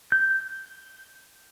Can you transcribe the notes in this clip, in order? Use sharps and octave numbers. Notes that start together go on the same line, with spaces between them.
G6